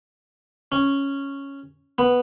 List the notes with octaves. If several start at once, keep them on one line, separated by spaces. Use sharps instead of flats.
C#4
B3